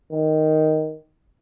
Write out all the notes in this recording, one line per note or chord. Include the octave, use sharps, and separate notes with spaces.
D#3